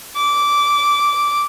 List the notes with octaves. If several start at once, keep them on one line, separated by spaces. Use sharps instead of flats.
D6